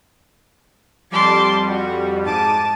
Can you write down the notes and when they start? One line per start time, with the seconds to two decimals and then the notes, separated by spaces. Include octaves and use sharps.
1.11 F2 G3 A5 C6 D6
1.68 F#4
2.25 G#2 A5 D6 D#7